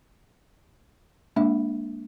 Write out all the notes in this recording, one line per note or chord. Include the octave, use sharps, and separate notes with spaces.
G#3 A#3 D4 E5